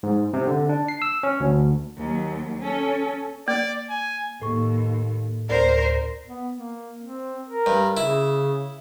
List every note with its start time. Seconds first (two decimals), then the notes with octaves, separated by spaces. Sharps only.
0.03 G#2
0.33 C3
0.47 D3
0.69 D4
0.88 C7
1.02 E6
1.23 C#4
1.40 D2
1.97 D#2 F#3
2.58 C#4 A4
3.48 A#3 D5
3.90 G#5
4.42 D#2 A2 C#6
5.49 D2 A#4 C5 D5
6.27 B3
6.54 A#3
7.02 C4
7.49 A#4
7.66 G2
7.97 C#3 E4